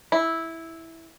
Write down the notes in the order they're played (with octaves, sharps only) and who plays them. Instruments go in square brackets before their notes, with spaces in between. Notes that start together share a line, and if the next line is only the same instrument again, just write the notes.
[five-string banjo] E4